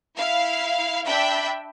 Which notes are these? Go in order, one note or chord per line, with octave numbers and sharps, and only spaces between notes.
E4 F5
D4 E5 G5 B5